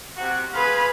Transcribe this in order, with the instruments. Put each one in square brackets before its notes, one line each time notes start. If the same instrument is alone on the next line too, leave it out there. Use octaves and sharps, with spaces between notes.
[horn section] C3 F#4
[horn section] G#4 C5 F5 [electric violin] B4 B5